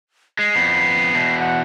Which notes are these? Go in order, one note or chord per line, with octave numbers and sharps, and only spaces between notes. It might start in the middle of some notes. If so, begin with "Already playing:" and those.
G#3 C7
F2 B3
E2 B2
F#5